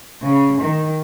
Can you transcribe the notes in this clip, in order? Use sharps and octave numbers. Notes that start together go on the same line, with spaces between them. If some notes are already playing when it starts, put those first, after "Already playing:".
C#3
D#3